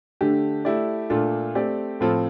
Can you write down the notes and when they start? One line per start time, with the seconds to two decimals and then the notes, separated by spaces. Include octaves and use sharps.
0.21 D3 A3 D4 G4
0.65 A3 E4 G4 D5
1.10 A#2 A3 D4 F4 A4
1.55 A3 C4 G4 D5
2.00 A2 F3 C4 F4 A4